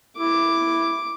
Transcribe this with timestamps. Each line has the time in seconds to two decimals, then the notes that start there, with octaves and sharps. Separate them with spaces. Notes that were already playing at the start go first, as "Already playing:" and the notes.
0.18 E4 D6